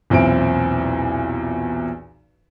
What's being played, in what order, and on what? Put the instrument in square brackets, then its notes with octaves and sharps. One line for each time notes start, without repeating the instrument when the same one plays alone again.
[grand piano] B1 E2 A#2 C4 E4 D7